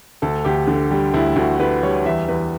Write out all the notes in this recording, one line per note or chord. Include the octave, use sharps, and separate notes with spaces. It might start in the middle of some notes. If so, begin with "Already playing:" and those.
D2 A4
D2 G4
D3
G3
D2 E4
D2 F#4
D3 B4
G3 C#5
E2 E5
E2 B4